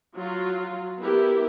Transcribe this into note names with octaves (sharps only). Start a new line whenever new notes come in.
F#3 F4
B3 E4 G4 A#4